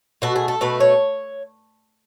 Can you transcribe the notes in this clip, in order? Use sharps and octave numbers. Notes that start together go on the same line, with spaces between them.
B2 A3 F#4
G#4
A4
B2 A3 B4
C#5